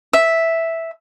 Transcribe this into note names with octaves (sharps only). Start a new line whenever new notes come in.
E5